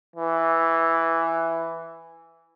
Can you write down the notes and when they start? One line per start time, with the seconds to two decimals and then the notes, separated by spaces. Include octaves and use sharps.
0.16 E3